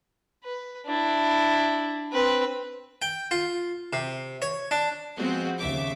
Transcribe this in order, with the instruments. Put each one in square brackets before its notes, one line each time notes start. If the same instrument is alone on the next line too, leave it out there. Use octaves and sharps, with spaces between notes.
[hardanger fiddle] B4
D4 E4
C4 B4
[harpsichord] G5
F4
C3
C#5
D4
[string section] F3 G#3 B3 C4 F#4
D#2 C#3 E5 D6